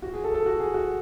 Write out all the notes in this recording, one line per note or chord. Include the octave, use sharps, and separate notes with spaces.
F#4
G#4
A4
A4
F#4
G#4
F#4